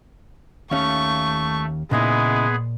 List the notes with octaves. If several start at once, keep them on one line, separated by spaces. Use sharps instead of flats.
D#2 A3 C#4 F5 C#6 A6 C#7
A#2 C#3 G#3 B3 D#4 E4 G#4